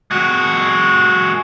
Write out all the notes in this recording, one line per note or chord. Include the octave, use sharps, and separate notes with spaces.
G#3 F#4